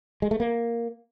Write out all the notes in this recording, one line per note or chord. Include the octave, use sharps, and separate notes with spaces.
G#3
A3
A#3